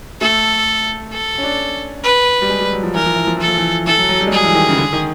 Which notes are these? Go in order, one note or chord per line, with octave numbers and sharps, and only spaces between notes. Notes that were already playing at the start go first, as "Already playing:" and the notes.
A3 A4
A4
C#4
D4
B4
G3
G#3
G3
F#3
F3
E3 A#4
F3
E3
F3
E3 A4
F3
E3
E3 A4
F#3
F#3
G3
G#3
G3 G#4
E3
D#3
C#3
D3
D#3